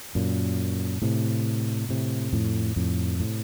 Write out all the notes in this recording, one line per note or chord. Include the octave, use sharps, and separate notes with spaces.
F#2 A#2
A2 C3
A2 C3
F2 A2
F2 A2
A2 C3